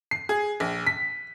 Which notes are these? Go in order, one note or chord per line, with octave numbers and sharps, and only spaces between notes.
C7
G#4
A#1
B6